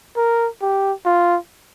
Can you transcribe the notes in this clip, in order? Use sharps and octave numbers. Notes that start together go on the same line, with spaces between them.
A#4
G4
F4